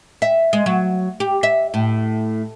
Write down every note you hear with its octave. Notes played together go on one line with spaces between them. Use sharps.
E5
G#3
F#3
G4
E5
A2